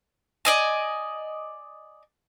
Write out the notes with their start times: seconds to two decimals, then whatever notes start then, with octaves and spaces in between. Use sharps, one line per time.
0.45 D5 D#5 G#5